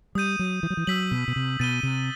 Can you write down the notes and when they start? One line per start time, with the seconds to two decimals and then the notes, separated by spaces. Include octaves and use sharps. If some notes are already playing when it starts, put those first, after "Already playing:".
0.15 G3 D#6 G6 D#7
0.39 F#3
0.63 E3
0.70 F#3
0.77 E3
0.87 F#3 E6 B6 F#7
1.11 B2
1.28 B2
1.36 C3
1.60 B2 A6 D#7 G7
1.83 C3